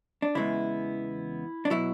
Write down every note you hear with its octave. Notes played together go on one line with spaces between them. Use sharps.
D4
E2 C#3 E3 G#3 B3 E4
D4
B2 F#3 E4